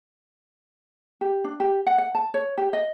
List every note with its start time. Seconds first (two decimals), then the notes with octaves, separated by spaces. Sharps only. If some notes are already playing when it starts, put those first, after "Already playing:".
1.21 G4
1.44 D4
1.60 G4
1.87 F#5
1.98 F#5
2.15 A5
2.34 C#5
2.58 G4
2.73 D#5